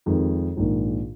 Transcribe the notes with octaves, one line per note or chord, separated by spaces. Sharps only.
F2 D#3 G#3
A#1 G#2 D#3